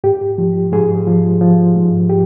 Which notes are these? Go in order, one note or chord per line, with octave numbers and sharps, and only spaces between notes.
G#2 G4
F3
G#2 G#4
F3
F3
G#2
G4